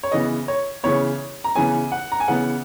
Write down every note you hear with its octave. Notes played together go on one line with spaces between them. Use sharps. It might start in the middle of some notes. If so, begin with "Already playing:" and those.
C#5
C#3 E3 B3 D#5
C#5
C#3 E3 B3 C#5
A#5
C#3 E3 B3 G#5
F#5
A#5
G#5
C#3 E3 B3 F#5